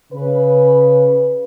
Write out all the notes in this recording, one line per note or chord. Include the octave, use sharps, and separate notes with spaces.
C#3 B4